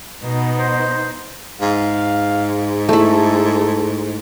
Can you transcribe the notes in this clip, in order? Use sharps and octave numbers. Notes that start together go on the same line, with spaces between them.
B2 B3 D#4
C5
G#2 F5
A3 E4 A4